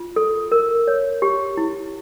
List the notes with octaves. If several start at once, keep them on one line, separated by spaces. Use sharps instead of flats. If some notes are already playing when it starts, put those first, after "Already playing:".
Already playing: F4
A4
A#4
C#5
G4
E4